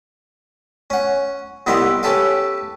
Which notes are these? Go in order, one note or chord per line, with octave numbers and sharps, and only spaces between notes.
C#4 F#5
C2 B3 D#4 E4 G4 C6
C#4 G4 A4 B4 F5